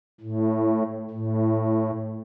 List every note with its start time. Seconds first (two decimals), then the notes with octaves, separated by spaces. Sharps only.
0.20 A2
1.10 A2